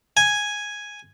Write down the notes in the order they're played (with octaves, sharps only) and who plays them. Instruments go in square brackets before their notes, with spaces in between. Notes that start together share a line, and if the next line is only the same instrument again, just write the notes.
[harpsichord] G#5